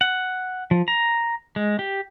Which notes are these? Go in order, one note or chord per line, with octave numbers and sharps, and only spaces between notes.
F#5
F3
A#5
G#3
G4